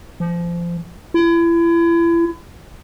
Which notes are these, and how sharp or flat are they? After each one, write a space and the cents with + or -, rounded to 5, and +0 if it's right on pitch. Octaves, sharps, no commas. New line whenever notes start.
F3 -25
E4 +35